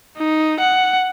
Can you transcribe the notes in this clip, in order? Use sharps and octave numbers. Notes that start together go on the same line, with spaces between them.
D#4
F#5